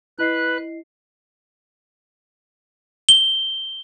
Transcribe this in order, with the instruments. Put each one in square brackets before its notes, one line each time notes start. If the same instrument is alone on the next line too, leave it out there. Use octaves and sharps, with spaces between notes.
[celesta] E4 D#5 C7 [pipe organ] B4 F#6
[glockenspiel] G7